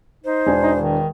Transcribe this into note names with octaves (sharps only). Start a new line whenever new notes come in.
D#4 C5
E1 D4 G#5
D#4
D#3